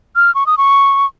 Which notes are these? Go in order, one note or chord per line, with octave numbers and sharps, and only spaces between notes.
F6
C#6
D#6
C#6